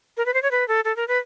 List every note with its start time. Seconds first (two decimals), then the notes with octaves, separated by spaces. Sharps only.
0.17 A#4
0.26 B4
0.34 C5
0.42 C#5
0.51 B4
0.68 A4
0.85 A4
0.96 A#4
1.08 B4